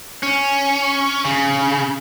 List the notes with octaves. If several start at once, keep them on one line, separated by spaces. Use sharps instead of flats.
C#4
C#3